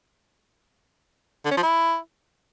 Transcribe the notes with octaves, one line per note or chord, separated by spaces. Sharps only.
D3
C#4
F3
E4